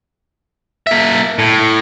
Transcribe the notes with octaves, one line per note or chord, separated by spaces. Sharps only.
A#3 E5
A2